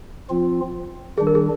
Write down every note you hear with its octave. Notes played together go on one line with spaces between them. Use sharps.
F3 C4 F4
D#3 G3 D4 G#4
A#4
G#4